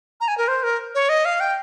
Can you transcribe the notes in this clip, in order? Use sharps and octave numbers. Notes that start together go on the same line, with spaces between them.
A#5
G#5
A#4
C5
A#4
C#5
D#5
F5
G5